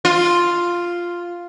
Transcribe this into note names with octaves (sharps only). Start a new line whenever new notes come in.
F4